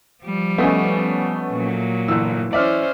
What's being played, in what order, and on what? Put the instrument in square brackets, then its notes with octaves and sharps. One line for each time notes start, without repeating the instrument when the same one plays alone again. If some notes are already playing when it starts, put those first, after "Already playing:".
[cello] F3 G3
[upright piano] A3 D#5 G#5 [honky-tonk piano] B3 C#4
[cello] A#2 F#3
[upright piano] G1 E6 [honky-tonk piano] E3
[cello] C#4 C5 [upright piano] D5 E5 F6